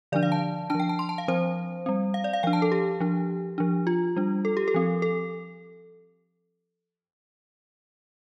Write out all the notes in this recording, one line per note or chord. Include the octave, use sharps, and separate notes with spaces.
D3 F3 D4 D5
F5
A5
F3 D4 A5
G5
A5
C6
A5
F5
F3 C4 C5
G3 C4
F5
D5
F5
F3 D4 G5
A5
A4
G4
F3 D4
F3 D4
F4
G3 D4
A4
G4
A4
F3 C4
A4